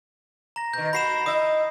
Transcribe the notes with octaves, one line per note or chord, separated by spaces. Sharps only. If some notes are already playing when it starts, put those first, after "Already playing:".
A#5 A#6
B2 D#3 G6
A#3 F#4 B5 C7 E7
E4 D#5 E5 D#6